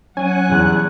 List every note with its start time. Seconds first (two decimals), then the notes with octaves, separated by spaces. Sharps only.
0.17 F#3 C#4 F#5 G#5 F#6
0.49 E2 G3